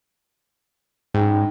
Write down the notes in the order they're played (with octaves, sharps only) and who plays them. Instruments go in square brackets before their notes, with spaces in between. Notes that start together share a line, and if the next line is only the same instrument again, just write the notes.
[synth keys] G#2 [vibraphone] C#4 D#4 G5